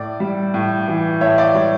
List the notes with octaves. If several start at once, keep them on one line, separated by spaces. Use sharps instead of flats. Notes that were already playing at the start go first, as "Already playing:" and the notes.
Already playing: A2 D5
G3
A2
E3
A2 C#5 E5
D5
G3 C#5